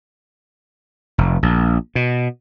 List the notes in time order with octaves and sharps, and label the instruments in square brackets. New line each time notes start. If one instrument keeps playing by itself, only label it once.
[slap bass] F1
A#1
B2